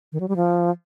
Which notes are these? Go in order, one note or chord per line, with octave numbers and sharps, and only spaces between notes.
D#3
F#3
G3
F3